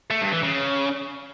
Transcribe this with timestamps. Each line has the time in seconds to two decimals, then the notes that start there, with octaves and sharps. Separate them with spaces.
0.11 A3
0.22 G2
0.33 E3
0.43 C#3